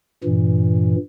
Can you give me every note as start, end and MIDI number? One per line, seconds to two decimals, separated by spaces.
0.24 0.96 43
0.24 0.96 46
0.24 0.96 52